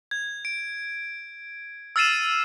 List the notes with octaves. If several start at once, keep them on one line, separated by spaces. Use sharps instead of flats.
G#6
D7
E6 F6 A6 C7 D#7 E7